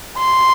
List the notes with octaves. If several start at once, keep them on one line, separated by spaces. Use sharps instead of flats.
C6